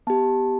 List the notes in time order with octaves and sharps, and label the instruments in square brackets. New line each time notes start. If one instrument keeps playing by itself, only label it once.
[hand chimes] B3 G4 A5